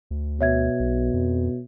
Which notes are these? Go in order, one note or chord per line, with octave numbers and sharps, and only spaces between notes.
D2
B2 C#5 E5 G#6
B1
F2